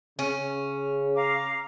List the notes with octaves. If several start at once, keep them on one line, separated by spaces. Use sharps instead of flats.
C#3 C#4
F5 A#5 D6